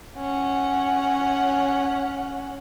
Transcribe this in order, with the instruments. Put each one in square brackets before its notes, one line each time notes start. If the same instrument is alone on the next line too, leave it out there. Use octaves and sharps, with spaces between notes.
[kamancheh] C#4 F#5